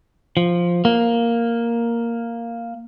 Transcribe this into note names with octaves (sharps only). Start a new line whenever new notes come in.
F3
A#3